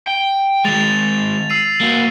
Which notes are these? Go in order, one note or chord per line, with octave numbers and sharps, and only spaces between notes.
G5
D#3 G#3 A6 F7
E6 C7 D#7
A#3 F#4